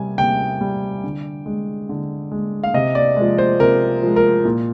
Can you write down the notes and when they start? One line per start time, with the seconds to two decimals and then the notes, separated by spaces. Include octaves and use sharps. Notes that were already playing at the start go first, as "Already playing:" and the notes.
Already playing: C3 G3 G#5
0.18 C3 G5
0.61 G3
1.03 D3
1.46 G#3
1.89 D3
2.32 G#3
2.64 F5
2.74 C3 D#5
2.95 D5
3.17 F3 G#3
3.38 C5
3.59 C3 A#4
4.02 F3 G#3
4.16 A#4
4.45 A#2